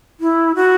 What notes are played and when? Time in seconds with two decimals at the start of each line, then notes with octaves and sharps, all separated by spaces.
0.20 E4
0.55 F#4